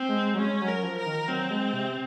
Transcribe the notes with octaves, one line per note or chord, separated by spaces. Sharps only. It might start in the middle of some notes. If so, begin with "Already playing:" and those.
Already playing: C4
G#3
F#3
G#3 C#4
F#3
A#4
F3
A#4
D#3
F#3 C4
G#3
C3